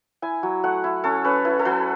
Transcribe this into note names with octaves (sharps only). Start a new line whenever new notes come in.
E4 G#5
F#3
A3 F#5
E4
C#4 A4
C#4 B4
E4 B4
A4
F#3 B4